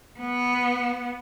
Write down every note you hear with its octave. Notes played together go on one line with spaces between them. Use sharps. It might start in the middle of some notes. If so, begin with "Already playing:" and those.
B3